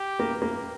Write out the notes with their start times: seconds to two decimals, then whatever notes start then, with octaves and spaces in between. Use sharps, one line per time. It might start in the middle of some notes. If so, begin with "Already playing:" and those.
Already playing: G4
0.19 A#3
0.42 A#3